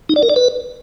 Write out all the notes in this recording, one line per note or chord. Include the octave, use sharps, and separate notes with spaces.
D#4
D5
A#4
D5
B4